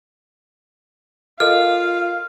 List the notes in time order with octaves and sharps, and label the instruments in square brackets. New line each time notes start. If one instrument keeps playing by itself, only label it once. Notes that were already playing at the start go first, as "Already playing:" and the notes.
[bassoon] F4 [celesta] A4 A#4 D#5 [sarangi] F5 [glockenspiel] F6